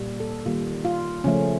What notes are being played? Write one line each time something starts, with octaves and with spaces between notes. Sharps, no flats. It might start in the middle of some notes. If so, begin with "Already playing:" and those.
Already playing: A#2 G3 A#3
A4
D#3 G3 A#3 F4
F4
C#3 F3 A3 C#4